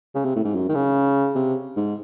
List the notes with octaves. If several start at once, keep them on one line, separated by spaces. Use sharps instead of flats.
C#3
C3
A2
G#2
F#2
D#3
C#3
C3
G#2